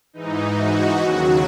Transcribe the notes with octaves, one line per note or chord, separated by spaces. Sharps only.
G#2 E3 D#4
F#4
D#2 C#3 F#3